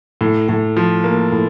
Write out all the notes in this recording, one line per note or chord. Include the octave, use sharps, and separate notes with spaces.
A2
A2
F3
A#3
A2